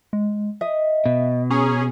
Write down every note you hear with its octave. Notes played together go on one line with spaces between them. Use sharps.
G#3
D#5 E5
B2
C#4 G#4 A#5